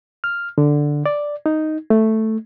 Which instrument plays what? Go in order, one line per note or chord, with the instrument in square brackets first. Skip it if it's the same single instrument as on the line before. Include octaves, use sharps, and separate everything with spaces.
[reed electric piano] F6
D3
D5
D#4
A3